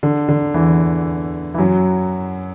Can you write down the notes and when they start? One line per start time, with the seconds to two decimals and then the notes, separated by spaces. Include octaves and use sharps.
0.03 D3
0.28 D3
0.54 E2 E3
1.54 E3
1.58 F#2 F#3